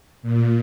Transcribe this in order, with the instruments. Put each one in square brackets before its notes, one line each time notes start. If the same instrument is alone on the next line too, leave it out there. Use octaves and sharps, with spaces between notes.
[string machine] A#2